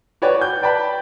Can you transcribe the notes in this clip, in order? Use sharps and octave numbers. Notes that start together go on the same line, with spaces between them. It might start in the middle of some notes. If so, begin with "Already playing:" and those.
F#4 B4 C#5 D5 G5 G#5
G6
B4 D5 G5 A5 B5